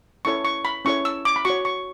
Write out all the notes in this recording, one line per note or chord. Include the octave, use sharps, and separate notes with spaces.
C#4 E4 A4 C#5 C#6
C#6
B5
C#4 E4 A4 C#5 C#6
E6
D6
B5
F#4 C#5 C#6
C#6